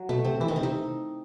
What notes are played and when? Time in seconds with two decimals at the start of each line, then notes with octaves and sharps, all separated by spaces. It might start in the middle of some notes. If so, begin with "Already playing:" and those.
Already playing: F#3
0.09 B2 A3
0.24 C3 C4
0.41 E3 E4
0.48 D#3 D#4
0.56 C4
0.61 C3 D#4